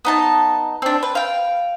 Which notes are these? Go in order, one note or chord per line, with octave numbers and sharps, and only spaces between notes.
B3 D#4 A5
C4 D4
B4
F5 G5